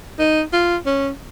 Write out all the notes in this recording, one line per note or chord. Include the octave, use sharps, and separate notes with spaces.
D#4
F4
C#4